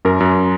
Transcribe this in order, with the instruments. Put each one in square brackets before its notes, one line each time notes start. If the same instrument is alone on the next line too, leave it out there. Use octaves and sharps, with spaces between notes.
[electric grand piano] F#2 A#4
F#2